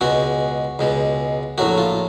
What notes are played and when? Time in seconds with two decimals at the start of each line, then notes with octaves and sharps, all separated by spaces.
0.01 C#2 B2 G#3 F#4
0.79 C#2 B2 G#3
1.58 A#1 A2 F#3 A3 F#4
1.78 F4